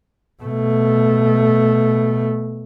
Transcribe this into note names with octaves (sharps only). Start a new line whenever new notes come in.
B2 A3